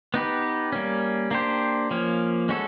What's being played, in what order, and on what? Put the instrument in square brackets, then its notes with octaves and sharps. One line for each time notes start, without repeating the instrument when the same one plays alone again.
[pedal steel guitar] B3 D#4 G4 B4
G3 A#3 C#4
A#3 D4 G4 C5
F3 A#3 C#4
G#3 C#4 F#4 A4